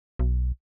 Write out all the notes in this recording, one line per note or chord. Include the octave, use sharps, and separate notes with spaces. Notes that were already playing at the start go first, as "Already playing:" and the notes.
B1